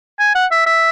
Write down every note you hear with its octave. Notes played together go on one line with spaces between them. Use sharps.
G#5
F#5
E5
E5